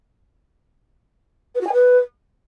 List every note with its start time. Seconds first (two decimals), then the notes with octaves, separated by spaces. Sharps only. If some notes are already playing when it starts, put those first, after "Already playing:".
1.55 B4
1.61 F#4
1.67 G#5
1.73 B4